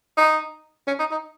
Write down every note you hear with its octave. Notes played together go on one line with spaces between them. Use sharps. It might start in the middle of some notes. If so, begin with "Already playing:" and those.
D#4
C#4
D#4
D#4